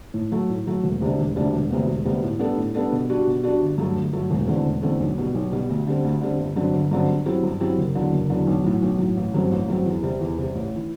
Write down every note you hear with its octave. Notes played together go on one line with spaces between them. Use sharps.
A2
F#3 A3
A2
F#3 A3
E1
D2 C3 G3 D4
E1
D2 C3 G3 D4
E1
D2 C3 G3 B3
E1
D2 C3 G3 B3
A2
G3 B3 D4 A4
A2
G3 B3 D4 A4
B2
G3 D4 F#4
B2
G3 D4 F#4
G1
G2 F#3 A3
G1
G2 F#3 A3
E1
E2 D3 A3 C4
E1
E2 D3 A3 C4
B1
B2 G3
B1
B2 G3
D2
D3 G3 C4
D2
D3 G3 C4
G1
G2 D3 F#3 C4
G1
G2 D3 F#3 C4
G2
F#3 C4 E4 G4
G2
F#3 C4 E4 G4
F#1
E2 D3 F#3
F#1
E2 D3 F#3
B1
A2 F#3
B1
A2 F#3
A1
G2 F#3 C4
A1
G2 F#3 C4
E2
C3 G3
E2
C3 G3
A1
E3